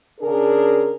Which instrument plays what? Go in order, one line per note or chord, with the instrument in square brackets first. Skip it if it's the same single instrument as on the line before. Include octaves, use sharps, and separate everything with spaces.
[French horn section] C#3 D4 G#4 A#4